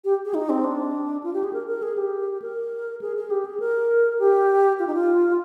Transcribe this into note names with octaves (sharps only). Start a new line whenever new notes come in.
G4
G#4
D#4
C4
D4
F4
G4
G#4
A#4
A#4
G#4
G4
A#4
G#4
G#4
G4
G#4
A#4
G4
F4
D#4
F4